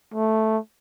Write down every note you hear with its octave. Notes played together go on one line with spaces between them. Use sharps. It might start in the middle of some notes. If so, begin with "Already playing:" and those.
A3